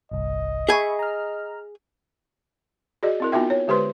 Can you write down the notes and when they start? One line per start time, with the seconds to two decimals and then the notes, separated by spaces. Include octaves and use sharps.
0.12 G1 C2 D#5
0.69 G#4 E5 G#5 B5 C#6
0.99 A#5 F6
3.03 F#4 G#4 D5 D#5
3.20 C4 E4 A#4
3.32 B3 D#4 F4 F#4 E5 G5
3.50 C#5
3.68 D3 G#3 G4 B4 C5 C6